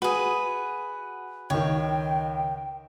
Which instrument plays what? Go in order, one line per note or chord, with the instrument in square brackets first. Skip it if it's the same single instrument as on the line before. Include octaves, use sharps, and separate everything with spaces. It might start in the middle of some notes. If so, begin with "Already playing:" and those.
[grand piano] F#4 [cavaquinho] G#4 B4
[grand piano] C#2 D#3 [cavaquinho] C#5 [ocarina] G5